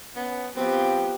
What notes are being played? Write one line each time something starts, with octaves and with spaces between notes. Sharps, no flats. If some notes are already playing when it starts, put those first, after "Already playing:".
B3 C#4
F3 B3 C4 G4